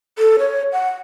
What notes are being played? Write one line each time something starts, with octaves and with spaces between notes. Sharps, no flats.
A4
C#5
F#5